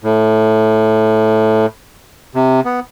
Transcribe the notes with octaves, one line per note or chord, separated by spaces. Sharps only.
A2
C3
B3